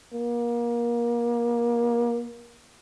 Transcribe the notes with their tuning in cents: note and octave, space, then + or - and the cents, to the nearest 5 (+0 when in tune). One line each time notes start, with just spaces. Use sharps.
A#3 +25